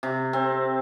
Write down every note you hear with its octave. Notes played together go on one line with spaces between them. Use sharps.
C3
C4